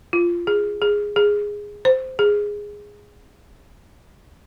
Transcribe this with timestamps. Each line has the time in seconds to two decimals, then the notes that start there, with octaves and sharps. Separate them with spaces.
0.13 F4
0.47 G#4
0.82 G#4
1.16 G#4
1.85 C5
2.19 G#4